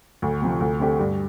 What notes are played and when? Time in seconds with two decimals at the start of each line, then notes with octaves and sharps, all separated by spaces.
0.22 D2
0.42 C3 F3
0.61 D2
0.80 D3 A3 C4 G4
1.00 G2